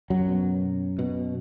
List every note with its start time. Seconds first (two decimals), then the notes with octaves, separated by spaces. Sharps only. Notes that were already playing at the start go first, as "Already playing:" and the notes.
0.10 F#2 F#3
0.29 B2
0.99 B2